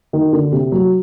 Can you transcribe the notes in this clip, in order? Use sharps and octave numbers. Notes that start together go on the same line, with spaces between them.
D#3
D3
C3
F#3